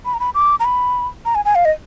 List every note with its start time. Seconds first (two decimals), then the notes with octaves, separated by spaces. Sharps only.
0.05 B5
0.14 A#5
0.20 B5
0.35 D6
0.60 A#5
0.65 B5
1.25 A#5
1.35 G#5
1.45 G#5
1.55 F5
1.65 D#5